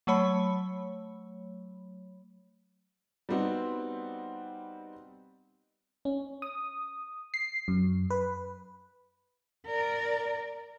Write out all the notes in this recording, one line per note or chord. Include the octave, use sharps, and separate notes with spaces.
F#3 A3 C#5 B5
G3 B3 C4 D#4 F#4
C#4
D#6
C7
F#2
B4
A#4 D5